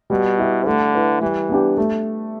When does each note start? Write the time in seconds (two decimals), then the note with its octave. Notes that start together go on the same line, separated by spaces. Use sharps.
0.10 B2 G3
0.39 E4 G4 B4
0.66 D3 A3
0.95 E4 B4
1.21 E3 G3
1.49 B3 D4 G4
1.77 A3